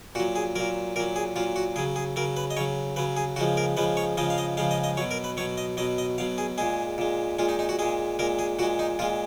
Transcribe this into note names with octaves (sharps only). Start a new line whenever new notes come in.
A#2 F#3 F#4
G#4
A#2 F#3 A#4
A#2 F#3 A#4
G#4
A#2 F#3 F4
F#4
C#3 F#3 G#4
G#4
C#3 F#3 A#4
B4
D#5
C#3 F#3 C#5
C#3 F#3 B4
G#4
C#3 F3 G#3 F#4
A#4
C#3 F3 G#3 B4
C#5
C#3 F3 G#3 D#5
F5
D#5
C#3 F3 G#3 F5
D#5
D#5
B2 F#3 C#5
A#4
B4
B2 F#3 C#5
D#5
B2 F#3 D#5
D#5
B2 F#3 F5
G#4
A#2 G#3 G#4
A#2 G#3
A#2 G#3 F4
D#4
D#4
F#4
A#2 G#3 G#4
A#2 G#3 A#4
G#4
A#2 G#3 F#4
D#4
A#2 G#3 F4